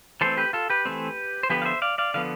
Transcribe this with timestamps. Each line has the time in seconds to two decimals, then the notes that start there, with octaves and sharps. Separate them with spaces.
0.21 E3 A3 C4 A4 C5
0.37 G4 B4
0.53 F4 A4
0.70 G4 B4
0.85 E3 A3 C4
1.43 C5
1.50 D3 F3 B3 G4 B4
1.62 F5
1.65 C5 E5
1.82 D5 F5
1.98 D5 F5
2.14 D3 F3 B3 F5